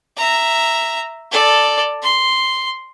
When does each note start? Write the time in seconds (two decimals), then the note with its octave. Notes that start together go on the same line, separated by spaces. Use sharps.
0.17 E5 A#5
1.31 A4 D5
2.02 C6